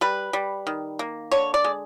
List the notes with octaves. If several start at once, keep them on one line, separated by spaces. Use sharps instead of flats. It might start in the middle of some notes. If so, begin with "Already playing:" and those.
G3 B4
G3
D#3
A#3
D3 C#5
D5
G#3